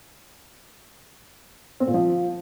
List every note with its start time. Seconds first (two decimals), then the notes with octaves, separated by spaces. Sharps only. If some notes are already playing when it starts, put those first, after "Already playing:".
1.80 C4
1.87 A#2
1.94 F3